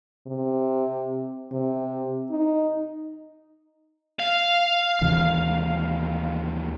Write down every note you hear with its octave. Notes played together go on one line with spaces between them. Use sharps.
C3
C3
D#4
F5
D#2 C3 E3